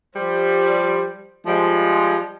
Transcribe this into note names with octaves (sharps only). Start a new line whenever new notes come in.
F3 G3 C5
F3 G3 G#3